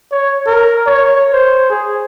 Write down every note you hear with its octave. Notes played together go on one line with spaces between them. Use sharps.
C#5
A#4
C#5
C5
G#4